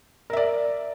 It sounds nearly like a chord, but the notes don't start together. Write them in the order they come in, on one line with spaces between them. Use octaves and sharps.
A#4 E5 D5